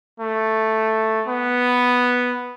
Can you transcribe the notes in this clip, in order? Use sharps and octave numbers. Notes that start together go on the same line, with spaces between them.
A3
B3